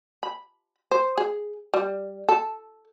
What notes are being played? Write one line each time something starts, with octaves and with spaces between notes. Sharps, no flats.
B5
C5
G#4
G3
A4